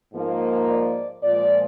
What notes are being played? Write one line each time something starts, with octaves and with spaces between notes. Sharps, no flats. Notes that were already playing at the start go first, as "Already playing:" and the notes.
G#2 F3 A#3 D#4
D5
A#2 F3 G#3 D5